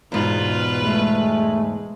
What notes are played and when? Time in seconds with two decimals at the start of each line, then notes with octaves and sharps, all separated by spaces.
0.12 E2 G#2 B2 F4 B4
0.82 G#3 A3